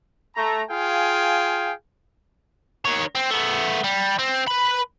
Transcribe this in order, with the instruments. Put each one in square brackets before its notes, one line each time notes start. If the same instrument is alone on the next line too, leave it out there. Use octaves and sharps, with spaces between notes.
[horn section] A3 A#5
F4 G#4 F5 G5 G#5
[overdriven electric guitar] D#3 C#5
C4
A3 B3
G3
C4
B4 B5